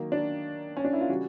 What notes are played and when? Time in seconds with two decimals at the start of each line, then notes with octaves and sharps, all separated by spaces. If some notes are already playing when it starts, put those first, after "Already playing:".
Already playing: D#3 F#3 A#3
0.12 D4
0.77 C#4
0.84 D4
0.93 E4
1.01 F4
1.09 C#3 E3 G3 F#4